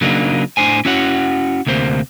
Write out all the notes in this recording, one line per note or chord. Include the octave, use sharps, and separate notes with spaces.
C#3 F#3 A#3 D4 D#4
A2 A#3 D4 C5 G#5
C#4 E4 F#4 C#5 F#5
D2 C3 A#3 C5